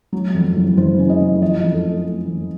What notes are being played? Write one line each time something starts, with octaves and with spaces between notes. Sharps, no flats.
F#3
F2
F#1
F#1 C5
C#3
D#5
C#3
F3 D#5
F2
A4
A3
A3
F2